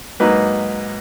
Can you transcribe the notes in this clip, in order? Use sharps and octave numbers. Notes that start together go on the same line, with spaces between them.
G#2 F#3 A#3 D#4 B4 D#5